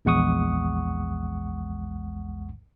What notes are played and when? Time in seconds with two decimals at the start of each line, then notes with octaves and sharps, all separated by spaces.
0.05 A#1 E2 G#3 F#5 C#6 D#6